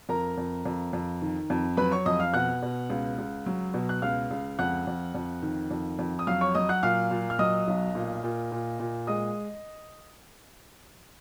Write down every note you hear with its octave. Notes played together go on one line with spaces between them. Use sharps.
F2 A#4 A#5
F2
F2
F2
D#3
F2
F#3 B4 B5
C#5 C#6
F2 D#5 D#6
F5 F6
B2 F#5 F#6
B2
C#2
C#2
F#3
B2
F#6
C#2 F5 F6
C#2
F2 F#5 F#6
F2
F2
D#3
F2
F2
D#6
F#3 F5 F6
C#5 C#6
F#3 D#5 D#6
F#5 F#6
A#2 F5 F6
A#2
F6
F#3 D#5 D#6
B1
A#2
A#2
A#2
A#2
G#3 D#5 D#6